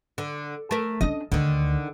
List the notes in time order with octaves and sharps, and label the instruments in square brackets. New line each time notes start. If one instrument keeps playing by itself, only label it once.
[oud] D3
A3 A#4
[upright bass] C#4 D4 [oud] D#5
[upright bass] D2 [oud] D3 D#3